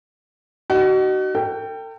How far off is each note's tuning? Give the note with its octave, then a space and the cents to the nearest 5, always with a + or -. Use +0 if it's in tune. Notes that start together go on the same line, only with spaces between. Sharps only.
D#4 -30 F#4 +35
A4 +45 G5 +0